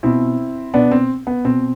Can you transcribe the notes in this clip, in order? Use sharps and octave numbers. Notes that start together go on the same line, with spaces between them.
B2 C4 E4
B2 B3 D4
C4
B3
B2 C4